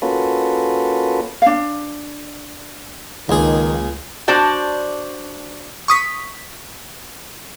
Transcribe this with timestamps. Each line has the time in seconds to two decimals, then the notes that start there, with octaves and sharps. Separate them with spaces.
0.02 A#3 C#4 F4 F#4 A4 B4
1.42 D4 F5
3.29 C#2 D#3 A#3 G#4
4.28 D4 F#4 C5 D5 A5
5.88 C#6 D#6 B6